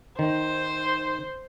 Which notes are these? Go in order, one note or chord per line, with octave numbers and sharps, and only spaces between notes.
D#3 C5